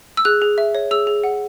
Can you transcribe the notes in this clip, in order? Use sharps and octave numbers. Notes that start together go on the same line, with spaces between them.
E6
G#4 F#6
G#4
E5
C#5
G#4 E6
G#4
F#5